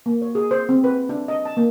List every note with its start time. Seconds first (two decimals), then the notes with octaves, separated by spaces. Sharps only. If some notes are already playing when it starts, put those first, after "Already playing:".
0.06 A#3
0.22 C#5
0.35 G#4
0.51 C5
0.69 C4
0.84 B4
1.09 D4
1.28 D#5
1.45 A5
1.57 A#3